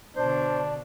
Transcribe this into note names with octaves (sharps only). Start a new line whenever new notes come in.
B2 D3 D4 C5